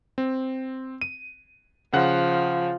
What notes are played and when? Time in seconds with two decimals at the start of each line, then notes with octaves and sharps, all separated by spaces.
0.18 C4
1.01 D#7
1.93 C#3 F3 F#5 F#6